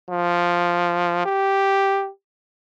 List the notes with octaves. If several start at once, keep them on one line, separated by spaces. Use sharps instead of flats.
F3
G4